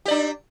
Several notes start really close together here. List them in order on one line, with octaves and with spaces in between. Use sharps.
G4 D5 D4